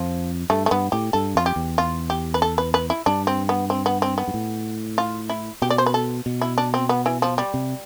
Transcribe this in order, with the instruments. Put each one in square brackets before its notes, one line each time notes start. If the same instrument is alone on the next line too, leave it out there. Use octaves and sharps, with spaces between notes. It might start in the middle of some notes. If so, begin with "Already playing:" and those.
Already playing: [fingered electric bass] F2 [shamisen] F3
[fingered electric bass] G2 [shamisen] A3
[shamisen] A3
[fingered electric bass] G2 [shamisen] B3
[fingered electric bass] A2 [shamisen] G4
[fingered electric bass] G2 [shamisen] A4
[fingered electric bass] F2 [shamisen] F4
[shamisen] G4
[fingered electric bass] E2
[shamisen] F4
G4
B4
A4
B4
B4
E4
[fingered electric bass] G2 [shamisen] D4
[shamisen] C4
B3
C4
B3
C4
B3
[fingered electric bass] G2
A2
[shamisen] F4
E4
[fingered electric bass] B2 [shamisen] G4
[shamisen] D5
C5
B4
A4
[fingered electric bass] B2
[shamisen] E4
D4
C4
B3
E3
F3
G3
[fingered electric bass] C3